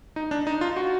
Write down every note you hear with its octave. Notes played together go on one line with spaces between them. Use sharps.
D#4
D4
D#4
F4
F#4